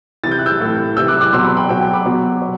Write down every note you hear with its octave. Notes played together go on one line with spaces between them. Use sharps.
C3 E3 A6
G6
F#6
E6 G6
A2 E3
C3 E3 E6 G6
D6 F#6
D6 F#6
B2 F#3 C6 E6
B5 D6
G5 B5
B2 F#3 G5
G5
B5 D6
B2 F#3
F#3